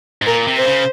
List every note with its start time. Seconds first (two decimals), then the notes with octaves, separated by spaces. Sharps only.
0.22 G#2
0.26 A#2 A#4
0.47 C3
0.57 C5
0.66 C#3